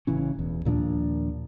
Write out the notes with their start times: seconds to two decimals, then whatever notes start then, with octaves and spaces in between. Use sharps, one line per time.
0.07 A1 C#3 E3 C#4
0.39 E1 E2
0.65 D#2 A#2 F3 D4